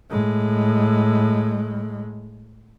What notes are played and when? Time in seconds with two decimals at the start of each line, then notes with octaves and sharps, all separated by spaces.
0.11 A2 G#3